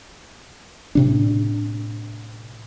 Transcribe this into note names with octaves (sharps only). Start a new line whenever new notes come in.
A2 C3 D4